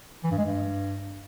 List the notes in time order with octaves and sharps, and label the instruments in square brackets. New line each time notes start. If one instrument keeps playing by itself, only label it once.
[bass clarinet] E3
G2
G#3
G2